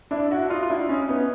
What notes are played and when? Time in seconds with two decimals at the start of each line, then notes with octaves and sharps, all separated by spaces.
0.11 D4 E4
0.31 E4 F#4
0.50 D#4 F4
0.63 F4
0.70 D4 E4
0.89 C#4 D#4
1.09 B3 C#4